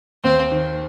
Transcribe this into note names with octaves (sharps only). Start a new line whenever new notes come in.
D#2 C4
D#3